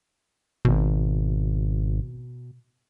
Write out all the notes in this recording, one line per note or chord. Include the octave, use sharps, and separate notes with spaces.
G#1 B2